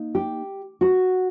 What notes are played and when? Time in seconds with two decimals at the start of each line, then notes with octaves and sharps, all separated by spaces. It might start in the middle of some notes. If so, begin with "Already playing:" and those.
Already playing: A#3 D#4
0.15 G4
0.81 F#4